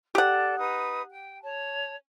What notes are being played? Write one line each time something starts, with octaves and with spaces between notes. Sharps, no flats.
G4 A4 D5 F#5
D#4 B4 D#6
G5
C#5 A5